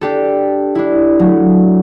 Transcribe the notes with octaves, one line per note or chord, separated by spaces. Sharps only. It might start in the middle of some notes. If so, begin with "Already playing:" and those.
D4 G4 A4
D4 E4
F#3 A3